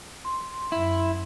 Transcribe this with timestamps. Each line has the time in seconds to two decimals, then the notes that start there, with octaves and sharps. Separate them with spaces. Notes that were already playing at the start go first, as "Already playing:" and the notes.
0.25 C6
0.72 F#2 E4